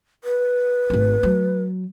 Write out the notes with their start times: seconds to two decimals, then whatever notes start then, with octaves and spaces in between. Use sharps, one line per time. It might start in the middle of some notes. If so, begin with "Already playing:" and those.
0.24 B4
0.90 G#1 A3
1.23 F#3